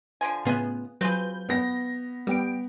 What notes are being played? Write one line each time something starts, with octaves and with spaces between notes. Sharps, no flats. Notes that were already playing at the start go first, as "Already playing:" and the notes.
D3 F3 G#5
A2 C#3 B3 F4 G#4 D#5
F#3 C4 F4 G#4 B4 G6
B3 A#6
G3 B3 G5 D7